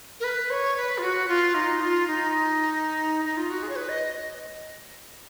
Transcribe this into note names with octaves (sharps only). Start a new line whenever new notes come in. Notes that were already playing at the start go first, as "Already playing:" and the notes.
A#4
B4
C#5
B4
F4
F#4
F4
D#4
F4
D#4
D#4
F4
F#4
G#4
C#5
B4
D#5